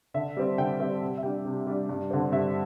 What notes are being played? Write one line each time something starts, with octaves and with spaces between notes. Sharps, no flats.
D3 E5
G3 C4
D3 G5
G3 C4 E5
C3
E5
G3 D4 G5
C3
G3 D4
G2
D3 C4
G2 E5